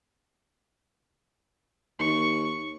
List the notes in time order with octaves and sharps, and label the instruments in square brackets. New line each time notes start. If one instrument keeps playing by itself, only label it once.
[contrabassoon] D#2 [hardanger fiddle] C#6